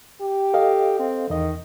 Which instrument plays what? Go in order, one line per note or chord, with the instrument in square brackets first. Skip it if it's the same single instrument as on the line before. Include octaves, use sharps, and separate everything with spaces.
[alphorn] G4
[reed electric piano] A4 D#5 F5
[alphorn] C4
[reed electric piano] E2 D#5 [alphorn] D#3